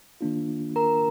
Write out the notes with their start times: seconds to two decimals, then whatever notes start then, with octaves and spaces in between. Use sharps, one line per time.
0.21 D#3 A#3 D4 F4
0.76 A#4 A#5